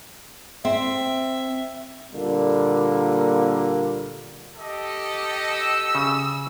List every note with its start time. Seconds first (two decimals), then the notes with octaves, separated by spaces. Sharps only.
0.65 C4 E5
2.13 A#2 D3 G3 A#3
4.57 G4 A4 D#5
5.51 E6
5.95 C#3